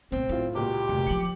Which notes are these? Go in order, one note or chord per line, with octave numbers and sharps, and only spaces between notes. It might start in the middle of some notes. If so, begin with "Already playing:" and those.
A#1 B3 C4
A2 D#4 F4
C#2 A#2 F#4 G4
F1
F3 F#3 C#7 F#7